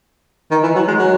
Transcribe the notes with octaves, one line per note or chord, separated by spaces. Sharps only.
D#3
E3
F#3
G#3
F#3